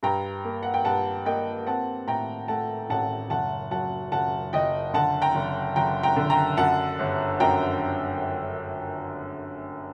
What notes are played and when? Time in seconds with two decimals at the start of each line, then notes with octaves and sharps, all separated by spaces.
0.03 G2 G5 A#5
0.45 A#3
0.63 F#5
0.74 G5
0.85 G2 F#5 A5
1.25 A#3 D#5 G5
1.67 C4 F#5 A5
2.07 A2 G5 A#5
2.48 A3 F#5 A5
2.90 A1 F#5 A5
3.30 F#1 F#5 A5
3.71 F#3 F#5 A5
4.12 F#1 F#5 A5
4.53 F#1 D#5 G5
4.94 D3 F#5 A5
5.22 G5 A#5
5.35 F#1
5.76 F#1 G5 A#5
6.03 G5 A#5
6.16 D3
6.30 G5 A#5
6.57 F#2 F#5 A5
6.99 G1
7.40 F#2 G5 A#5